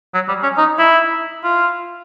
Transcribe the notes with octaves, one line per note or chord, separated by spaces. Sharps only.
F#3
G3
C#4
D#4
E4
F4